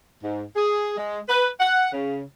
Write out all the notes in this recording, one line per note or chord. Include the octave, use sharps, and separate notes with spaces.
G#2
G#4
G#3
B4
F#5
C#3